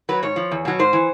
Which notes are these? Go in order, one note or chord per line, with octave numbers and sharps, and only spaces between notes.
F#3 B4
G#2 C#5
F3
E2
B2 F#3
G#2 C5
E3